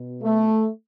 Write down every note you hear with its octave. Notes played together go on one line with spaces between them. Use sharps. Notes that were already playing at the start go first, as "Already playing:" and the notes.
Already playing: B2
A3